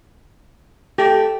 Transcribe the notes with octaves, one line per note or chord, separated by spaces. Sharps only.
A3 G4